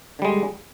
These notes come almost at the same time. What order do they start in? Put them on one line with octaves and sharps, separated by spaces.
D3 G3 G#3